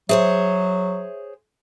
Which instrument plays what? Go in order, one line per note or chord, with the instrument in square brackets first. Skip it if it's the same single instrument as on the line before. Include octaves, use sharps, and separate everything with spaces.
[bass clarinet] F#3 [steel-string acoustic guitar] G#4 C5 C#5 [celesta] E5